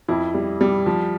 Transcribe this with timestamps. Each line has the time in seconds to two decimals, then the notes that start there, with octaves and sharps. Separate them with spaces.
0.08 F2 E4
0.34 G3
0.61 G3
0.86 F3